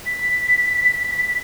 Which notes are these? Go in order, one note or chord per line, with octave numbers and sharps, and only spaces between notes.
B6